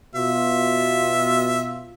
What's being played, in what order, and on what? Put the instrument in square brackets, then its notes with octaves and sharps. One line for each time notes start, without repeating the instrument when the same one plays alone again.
[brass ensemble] B2 F4 [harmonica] E5